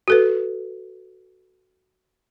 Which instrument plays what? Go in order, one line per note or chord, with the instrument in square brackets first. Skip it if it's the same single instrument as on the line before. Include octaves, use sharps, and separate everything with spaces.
[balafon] F#4 A4 B4